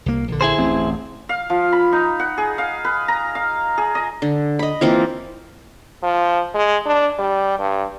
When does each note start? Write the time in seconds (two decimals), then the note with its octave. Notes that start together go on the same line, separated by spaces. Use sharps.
0.06 C2 A#3
0.28 A#1 D3
0.41 E4 G#4 C5
0.57 D1 A1 C4
1.29 F5
1.50 F3
1.73 B5
1.93 D#4
2.20 F#5
2.38 G#4
2.58 F5
2.85 B4
3.08 A#5
3.35 F5
3.78 G#4
3.95 D#5
4.22 D3
4.59 D#5 B5
4.81 E3 A#3 C4 F4
6.03 F3
6.55 G#3
6.86 D4
7.19 G3
7.59 G2